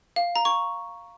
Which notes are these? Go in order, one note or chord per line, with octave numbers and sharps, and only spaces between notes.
F5
A#5
C#6